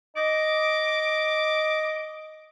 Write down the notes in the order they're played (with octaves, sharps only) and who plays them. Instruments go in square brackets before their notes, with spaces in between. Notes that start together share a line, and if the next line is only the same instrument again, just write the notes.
[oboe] D#5 [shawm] D6